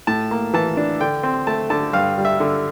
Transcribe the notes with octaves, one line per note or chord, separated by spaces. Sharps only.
A2 A5
A#3
E3 A5
D4
D3 G5
C4
A3 A5
D3 A5
G2 F5
G3
E5
D3